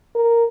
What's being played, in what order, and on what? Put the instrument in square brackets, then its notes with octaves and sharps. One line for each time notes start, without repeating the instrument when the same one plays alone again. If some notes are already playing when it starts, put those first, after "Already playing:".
[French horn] A#4